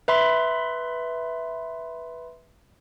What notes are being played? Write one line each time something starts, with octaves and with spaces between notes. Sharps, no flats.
B4 E5 B5 C6